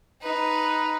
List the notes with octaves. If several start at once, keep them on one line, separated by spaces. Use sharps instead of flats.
D#4 B4